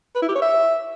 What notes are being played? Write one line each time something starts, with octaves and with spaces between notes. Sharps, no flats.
B4
E4
G4
C#5
E5